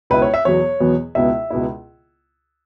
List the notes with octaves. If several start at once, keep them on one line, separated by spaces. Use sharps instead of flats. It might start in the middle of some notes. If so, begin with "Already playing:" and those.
C#2 B2 B3 E4 B4
C#5
E5
E2 B2 F#3 B3 C#5
E2 B2 F#3 B3
C#2 B2 B3 E4 E5
C#2 B2 B3 E4